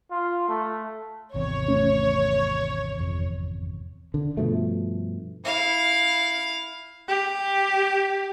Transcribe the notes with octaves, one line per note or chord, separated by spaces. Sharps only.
F4
A3
G#1 E2 C3 C#5
A3 C#4
F2
D3
G2 B2 F3 A3
E4 F5
G4